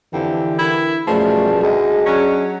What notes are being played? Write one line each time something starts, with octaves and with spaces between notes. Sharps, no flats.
F2 D3 E3 G4
E4 A#4
F#2 B2 F3 G3 A3 G#4
D2 G#4 D#5
F#3 C#4 D4